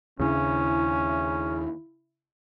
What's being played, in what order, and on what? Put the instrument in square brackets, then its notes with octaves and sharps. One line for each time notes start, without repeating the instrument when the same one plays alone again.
[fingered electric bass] D#2 A#3 D4 [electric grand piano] C#3 [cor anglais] C#4 [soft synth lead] E4